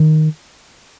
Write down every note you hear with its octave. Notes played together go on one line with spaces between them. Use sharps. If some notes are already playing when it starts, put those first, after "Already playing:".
Already playing: D#3